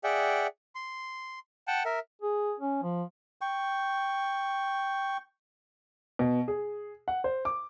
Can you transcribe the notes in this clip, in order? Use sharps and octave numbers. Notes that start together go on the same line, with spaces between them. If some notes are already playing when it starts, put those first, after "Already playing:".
G#4 D5 E5 F#5 G5
C6
F#5 G5 A5
A#4 E5
G#4
C#4
F3
G5 C#6
B2
G#4
F#5
C5
D6